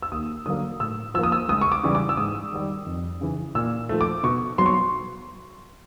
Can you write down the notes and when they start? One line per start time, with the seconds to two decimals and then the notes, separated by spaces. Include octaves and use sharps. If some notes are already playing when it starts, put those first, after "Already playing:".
0.02 E6
0.12 D#2 D#6
0.46 D3 F#3 A#3 D#6
0.80 A2 E6
1.14 F3 E6
1.19 A#3 D#6
1.32 E6
1.49 C#2 D#6
1.61 C#6
1.72 D6
1.83 C#3 E3 G3
1.95 D6
2.09 E6
2.17 G#2 D#6
2.52 D#3 G3
2.86 F2
3.21 C#3 E3
3.55 A#2 E6
3.89 F3 A3
4.01 D6
4.23 B2 C#6
4.58 F#3 B3 C6
4.66 C#6
4.74 C6